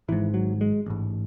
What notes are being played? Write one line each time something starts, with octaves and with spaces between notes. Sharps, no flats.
G#1 G#2 E3
F#3
G#3
A1 G#2